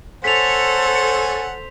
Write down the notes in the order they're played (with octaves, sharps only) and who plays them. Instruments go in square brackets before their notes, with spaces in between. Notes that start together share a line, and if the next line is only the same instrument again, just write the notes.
[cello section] A4 [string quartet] C5 [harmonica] C#5 F#5 G#5 [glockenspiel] B6 F7